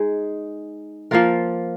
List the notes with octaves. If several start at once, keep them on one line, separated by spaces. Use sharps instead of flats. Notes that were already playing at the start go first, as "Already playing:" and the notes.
Already playing: G#3 D#4 G#4
F3 A#3 F4 A#4